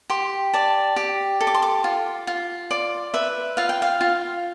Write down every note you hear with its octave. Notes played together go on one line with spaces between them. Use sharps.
G4 C6
D5 A5
G4
A4
D6
C6
D6
F4
F4
D5 C6
B4 E5
F4 F5
G5
F5
F4